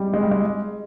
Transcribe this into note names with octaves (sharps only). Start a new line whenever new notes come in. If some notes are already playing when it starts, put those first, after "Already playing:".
Already playing: G3 G#3
G#3
G3
G#3